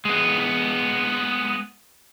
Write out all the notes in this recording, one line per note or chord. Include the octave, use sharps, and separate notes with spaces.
G#3 B3